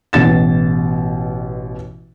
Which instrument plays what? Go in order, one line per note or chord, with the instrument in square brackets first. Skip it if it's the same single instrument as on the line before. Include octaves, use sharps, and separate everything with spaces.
[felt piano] A1 B2 A6 E7